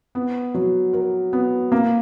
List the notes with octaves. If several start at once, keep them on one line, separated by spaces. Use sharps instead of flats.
B3
F#3
A#4
B3
A#3